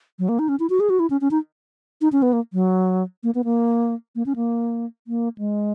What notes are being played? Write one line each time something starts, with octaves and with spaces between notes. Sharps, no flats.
F#3
A#3
D#4
C#4
E4
F#4
G#4
F#4
E4
C#4
C#4
D#4
D#4
C#4
B3
A#3
F#3
A#3
B3
A#3
A#3
C#4
A#3
A#3
G#3